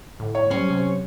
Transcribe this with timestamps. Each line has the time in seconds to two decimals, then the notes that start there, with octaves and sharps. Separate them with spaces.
0.20 A2 D3
0.35 C#5
0.50 F#3 G3 C#4 C5
0.70 C3